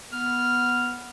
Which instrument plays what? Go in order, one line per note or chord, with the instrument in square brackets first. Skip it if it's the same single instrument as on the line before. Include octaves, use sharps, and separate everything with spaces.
[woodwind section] B3 F6